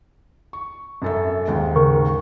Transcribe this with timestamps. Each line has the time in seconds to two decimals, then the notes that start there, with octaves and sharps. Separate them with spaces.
0.53 C#6
1.02 F#2 A4 E5
1.48 D#2 G#2
1.76 C#3 A#4 C#6